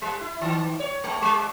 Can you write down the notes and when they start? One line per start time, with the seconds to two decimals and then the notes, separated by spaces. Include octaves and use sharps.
0.02 G3
0.21 E4
0.41 D#3
0.80 C#5
1.04 G#3
1.22 G3